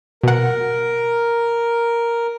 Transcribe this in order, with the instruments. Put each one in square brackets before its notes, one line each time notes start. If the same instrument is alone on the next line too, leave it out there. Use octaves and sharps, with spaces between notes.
[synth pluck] B2 F#5 [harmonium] A#4